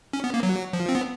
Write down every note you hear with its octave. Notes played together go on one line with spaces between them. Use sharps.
C#4
B3
A#3
F#3
F3
C4
B3